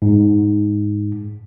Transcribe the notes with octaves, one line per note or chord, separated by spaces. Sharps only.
G#2